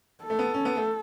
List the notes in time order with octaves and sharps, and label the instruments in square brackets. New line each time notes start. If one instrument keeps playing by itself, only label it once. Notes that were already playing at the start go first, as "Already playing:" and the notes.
[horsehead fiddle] A4
[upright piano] A3
B3
C#4
B3
A3